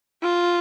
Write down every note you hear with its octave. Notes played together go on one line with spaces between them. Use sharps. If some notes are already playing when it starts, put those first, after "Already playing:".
F4